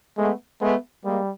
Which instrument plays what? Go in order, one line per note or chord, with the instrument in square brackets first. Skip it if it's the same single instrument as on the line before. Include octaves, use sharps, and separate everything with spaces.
[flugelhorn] G#3 [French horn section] A3 B3
[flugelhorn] G#3 [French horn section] A3 B3
[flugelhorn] G3 [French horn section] G#3 A#3